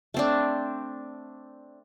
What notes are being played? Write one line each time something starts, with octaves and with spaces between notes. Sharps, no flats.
A3 C4 D4